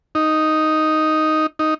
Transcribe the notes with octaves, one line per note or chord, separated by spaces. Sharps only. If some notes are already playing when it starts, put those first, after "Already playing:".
D#4
D#4